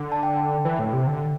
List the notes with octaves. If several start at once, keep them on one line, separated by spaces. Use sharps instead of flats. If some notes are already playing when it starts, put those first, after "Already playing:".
Already playing: D3
A5
G5
E3
A2
C3
D3